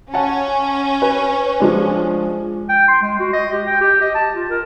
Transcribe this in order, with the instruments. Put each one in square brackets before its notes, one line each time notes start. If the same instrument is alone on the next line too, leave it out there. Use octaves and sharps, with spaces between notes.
[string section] C#4 [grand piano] F#5 G#5 A5
[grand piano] B4
F3 G#3 D4
[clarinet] G5
C6
G#3
F#4
D#5
G4
G5
G4
D#5
A5
F4
A#4